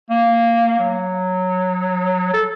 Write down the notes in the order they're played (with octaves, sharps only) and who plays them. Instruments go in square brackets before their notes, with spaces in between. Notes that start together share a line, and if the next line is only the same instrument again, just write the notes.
[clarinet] A#3
F#3
A4